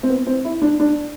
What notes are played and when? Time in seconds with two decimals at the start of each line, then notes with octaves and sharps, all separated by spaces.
0.03 C4
0.10 B3
0.27 C4
0.45 E4
0.62 D4
0.80 D4